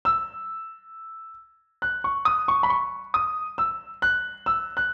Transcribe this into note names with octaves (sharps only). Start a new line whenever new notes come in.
E6
F#6
C#6
D#6
C#6
B5
C#6
D#6
E6
F#6
E6
F#6